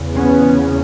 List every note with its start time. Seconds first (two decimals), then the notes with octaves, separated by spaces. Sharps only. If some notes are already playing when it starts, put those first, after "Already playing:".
Already playing: E2 C#3
0.15 B3 C#4